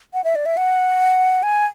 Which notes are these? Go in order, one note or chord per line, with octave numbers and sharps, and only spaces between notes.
F#5
E5
D5
E5
F#5
G#5